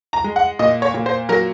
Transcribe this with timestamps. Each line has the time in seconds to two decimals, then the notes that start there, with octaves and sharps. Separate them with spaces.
0.13 A#5
0.24 G#3
0.36 F#5
0.59 A#2 D#5
0.82 C#5
0.94 A#2
1.06 C5
1.29 F#3 A#4